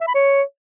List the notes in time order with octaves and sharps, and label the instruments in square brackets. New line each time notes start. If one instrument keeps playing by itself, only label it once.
[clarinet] E5
B5
C#5